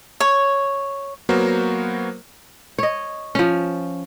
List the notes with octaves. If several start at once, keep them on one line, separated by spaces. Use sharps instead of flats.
C#5
F#3 A#3 B3 F#4 A#4 C5
C#5 D#5
F3 C#4